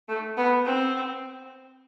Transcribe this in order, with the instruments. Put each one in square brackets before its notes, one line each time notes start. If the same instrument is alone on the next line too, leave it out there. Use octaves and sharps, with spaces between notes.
[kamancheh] A3
B3
C4